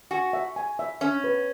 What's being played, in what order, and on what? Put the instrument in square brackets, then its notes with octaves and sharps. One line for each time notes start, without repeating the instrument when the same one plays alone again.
[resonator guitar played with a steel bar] F#4 [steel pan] G#5
[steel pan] E5
G#5
E5
[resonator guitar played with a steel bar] C#4 [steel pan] E5
[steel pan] B4